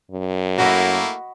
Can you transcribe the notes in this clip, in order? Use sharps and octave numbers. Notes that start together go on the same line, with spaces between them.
F#2
A3 A#3 E4 F#4 B4 D#5